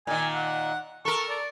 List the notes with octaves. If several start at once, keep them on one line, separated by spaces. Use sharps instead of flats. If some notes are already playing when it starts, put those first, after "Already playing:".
A#2 D#3 G#5
F#5
A4 A#4 C#6
D5